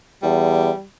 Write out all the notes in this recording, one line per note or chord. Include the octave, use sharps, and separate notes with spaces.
E2 G3